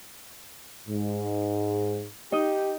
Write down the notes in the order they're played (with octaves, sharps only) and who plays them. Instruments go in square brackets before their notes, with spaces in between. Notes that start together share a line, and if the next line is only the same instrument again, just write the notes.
[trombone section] G#2
[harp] D#4 D#5 [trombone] G4